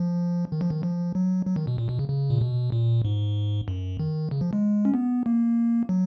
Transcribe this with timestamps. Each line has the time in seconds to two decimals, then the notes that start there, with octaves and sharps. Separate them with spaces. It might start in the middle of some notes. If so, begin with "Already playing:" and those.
Already playing: F3
0.52 D#3
0.61 F3
0.70 D#3
0.83 F3
1.15 F#3
1.46 F#3
1.56 D#3
1.67 B2
1.78 A#2
1.89 B2
1.99 C#3
2.10 C#3
2.30 A#2
2.41 B2
2.72 A#2
3.05 G#2
3.68 F#2
3.99 D#3
4.31 C#3
4.41 F3
4.53 G#3
4.85 C#4
4.94 B3
5.26 A#3
5.89 F#3